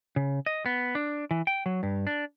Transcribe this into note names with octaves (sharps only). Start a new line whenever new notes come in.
C#3
D#5
B3
D4
E3
G5
F#3
G2
D4